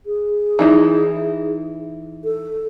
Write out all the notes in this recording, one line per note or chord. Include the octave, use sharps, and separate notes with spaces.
G#4
E3 D#4 E4
A4